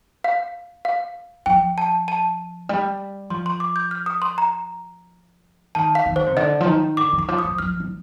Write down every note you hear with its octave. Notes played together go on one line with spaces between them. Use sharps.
F5
F5
F3 G5
A5
A5
G3
F3 C6
C6
D6
G6
F6
D#6
C6
A#5
D#3 A5
F5
D#3
C5
C3
D3 D#5
F3
D#3
D3 D6
D#3
D6
F3
D#6
F3
F3 F6
F3